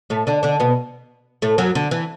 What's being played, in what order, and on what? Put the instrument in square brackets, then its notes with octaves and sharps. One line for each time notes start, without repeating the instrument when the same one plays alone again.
[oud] A2 A3
D3 D4
D3 D4
B2 B3
A2 A3
F#2 F#3
D3
E3